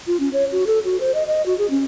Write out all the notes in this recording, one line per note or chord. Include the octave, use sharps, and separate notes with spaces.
F4
C#4
C#5
F#4
A4
F#4
C5
D#5
D#5
F#4
G#4
C#4